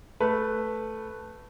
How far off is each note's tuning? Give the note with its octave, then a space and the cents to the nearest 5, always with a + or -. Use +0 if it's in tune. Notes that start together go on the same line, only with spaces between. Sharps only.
A3 +0 B4 +0